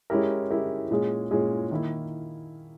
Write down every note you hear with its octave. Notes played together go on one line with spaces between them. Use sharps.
G#3 C#4 E4 G4 A#4
G#3 C#4 E4 G4 A#4
A#2 G#3 C#4 G#4
A#2 G#3 C#4 G#4
D#3 A#3 E4